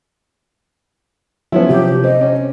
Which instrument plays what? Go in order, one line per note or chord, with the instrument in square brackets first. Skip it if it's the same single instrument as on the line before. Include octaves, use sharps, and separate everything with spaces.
[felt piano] F3 F#3 [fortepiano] B3 C#4 E4
[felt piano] C3 [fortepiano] F3 [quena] G4
[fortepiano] C4 [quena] D#5
[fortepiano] C#4